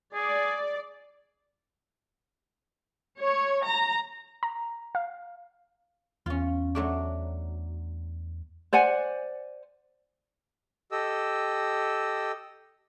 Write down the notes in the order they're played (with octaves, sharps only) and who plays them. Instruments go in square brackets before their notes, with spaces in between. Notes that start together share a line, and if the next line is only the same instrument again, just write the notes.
[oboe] G#4 [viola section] D5
[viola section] C#5
A#5
[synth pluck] A#5
F5
[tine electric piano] E2 [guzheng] C#4 F4
[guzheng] F#3 A3 D4
[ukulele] C5 D5 F#5 G#5
[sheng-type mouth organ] G4 A4 D#5 E6